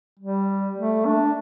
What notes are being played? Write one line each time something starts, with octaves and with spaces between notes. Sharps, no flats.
G3
A3
D4